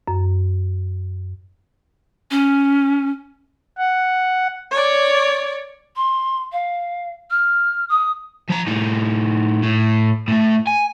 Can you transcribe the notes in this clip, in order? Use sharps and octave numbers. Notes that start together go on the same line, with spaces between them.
F#2
C#4
F#5
C#5 D5
C6
F5
F6
D#6
F3 A#5
A2 D#4
A2
A2 A3
G#5